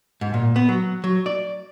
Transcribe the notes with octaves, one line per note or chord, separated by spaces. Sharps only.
G#2
A#2
B3
F#3
F#3
D5